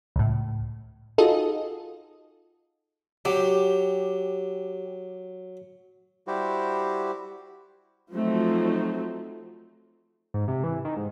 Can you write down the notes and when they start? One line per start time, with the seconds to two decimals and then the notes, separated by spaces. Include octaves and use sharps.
0.16 C#2 A2
1.18 D#4 F4 F#4 G#4 A4 D#5
3.25 F#3 G4
6.27 G3 E4 F#4 G4 C5
8.12 F3 F#3 A3 C4 D#4
10.34 G#2
10.48 C3
10.64 E3
10.85 D#3
10.97 G#2